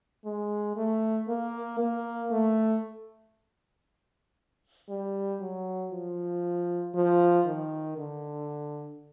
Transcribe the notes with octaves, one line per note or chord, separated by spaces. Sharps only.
G#3
A3
A#3
A#3
A3
G3
F#3
F3
F3
D#3
D3